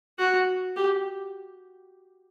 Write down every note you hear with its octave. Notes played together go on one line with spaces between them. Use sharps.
F#4
G4